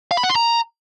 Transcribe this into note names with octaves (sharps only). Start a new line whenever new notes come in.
F5
B5
F#5
C6
A#5